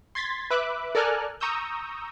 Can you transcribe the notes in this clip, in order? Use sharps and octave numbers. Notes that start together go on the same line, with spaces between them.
C6 G#6 A6 B6
B4 E5 B5 D6 F#6
A4 A#4 D5 G#5 F6 F#6
A#5 C#6 D#6 E6 G6